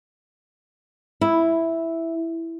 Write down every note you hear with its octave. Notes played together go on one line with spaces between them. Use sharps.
E4